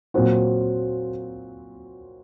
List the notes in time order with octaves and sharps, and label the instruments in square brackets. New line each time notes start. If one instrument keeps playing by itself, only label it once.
[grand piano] A#2 F#3 C4 F#4